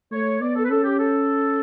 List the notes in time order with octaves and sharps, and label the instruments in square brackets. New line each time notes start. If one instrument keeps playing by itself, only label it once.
[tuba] A3 [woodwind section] C#5
[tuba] B3 [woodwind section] D5
[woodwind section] A4
B4
[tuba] C#4 [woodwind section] A4
[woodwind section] G4
A4